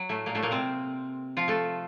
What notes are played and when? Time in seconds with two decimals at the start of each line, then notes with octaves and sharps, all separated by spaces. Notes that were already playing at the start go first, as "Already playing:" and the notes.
Already playing: F#3
0.09 A2 A3
0.26 A#2 A#3
0.35 A2 A3
0.42 A#2 A#3
0.51 C3 C4
1.37 F3 F4
1.48 A3 A4